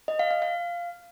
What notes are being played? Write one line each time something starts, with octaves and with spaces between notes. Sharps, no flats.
D#5
F5
F5
F5